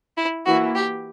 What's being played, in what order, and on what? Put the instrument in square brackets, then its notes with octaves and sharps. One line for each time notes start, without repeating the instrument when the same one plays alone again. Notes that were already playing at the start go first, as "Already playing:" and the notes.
[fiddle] E4
[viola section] E3 A#3 E4 [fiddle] F#4
[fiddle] G4